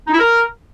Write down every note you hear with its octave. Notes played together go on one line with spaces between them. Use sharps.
D#4
E4
A#4